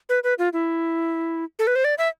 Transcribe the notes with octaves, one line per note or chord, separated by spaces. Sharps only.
B4
B4
F4
E4
A4
B4
C5
D5
E5